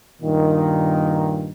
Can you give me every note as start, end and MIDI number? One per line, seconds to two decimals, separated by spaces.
0.22 1.52 43
0.22 1.52 46
0.22 1.52 51